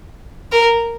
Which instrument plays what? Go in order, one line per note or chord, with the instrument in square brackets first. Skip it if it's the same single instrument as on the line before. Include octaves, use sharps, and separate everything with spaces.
[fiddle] A#4